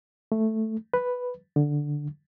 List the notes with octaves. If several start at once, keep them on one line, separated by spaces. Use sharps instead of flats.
A3
B4
D3